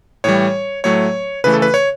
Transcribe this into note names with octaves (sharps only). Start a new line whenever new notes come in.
A2 E3 G3 C#5
A2 F#3 A3 C#5
C#3 E3 A3 B4
A4
B4
C#5